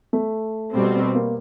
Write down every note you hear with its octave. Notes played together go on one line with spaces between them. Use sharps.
A3
B2 G3 C4
A#3